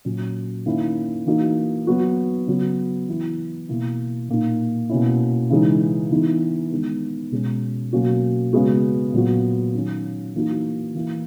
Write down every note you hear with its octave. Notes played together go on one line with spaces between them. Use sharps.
A#2 F#3 C#4
D#3 A#3 C#4 E4
E3 A#3 D#4 F#4
F#3 B3 F#4
C#3 F#3 B3
E3 B3 E4
B2 A#3 E4
A#2 A#3 D#4
B2 A#3 C#4 E4
C#3 E3 G#3 D#4
E3 B3 D#4
D#3 G#3 B3
B2 G#3 C#4
B2 F#3 A#3 C#4 F#4
C#3 G#3 B3 F#4
A#2 F#3 B3 F#4
D#3 F#3 C#4
E3 A#3 D#4 F#4
E3 A#3 E4